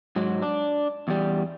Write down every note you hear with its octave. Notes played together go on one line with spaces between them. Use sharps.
G#2 F#3
D4
E2 G3